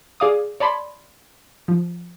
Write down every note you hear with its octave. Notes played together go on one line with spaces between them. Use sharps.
G#4 D5 F5 D6 D#6
C#5 D5 A5 B5 C6
F3